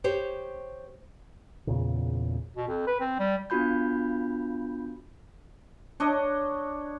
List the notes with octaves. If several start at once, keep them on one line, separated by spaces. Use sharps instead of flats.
G4 C5 C#5
E2 A#2 C#3
B2
F2
B4
C4
G3
B3 D4 F4 F#4 B5 G6
D4 C#5 D#5